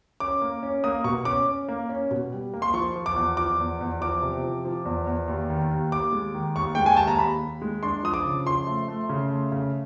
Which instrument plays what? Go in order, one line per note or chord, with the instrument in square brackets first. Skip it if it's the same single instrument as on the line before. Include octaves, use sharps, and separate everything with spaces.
[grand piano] C#4 D6
A#3
C#4
A#3 D#6
B2 C#6
C#4 D6
C#4
A#3
C#4
B2
G3
A#3
C6
F3 C#6
F3
D6
E2
F3 D6
E2
E2
F3 D6
C3
F3
F3
E2
E2
D#2
D#3
D#2
D#2 D6
G#3
D#3
D#2 C#6
G#3 G5
G#5
D#2 A5
A#5
D#2 B5
D#2
G#3
D4 C6
F3 D#6
D6
C#3
F3 C6
A3
A3
C#3
A3
C#3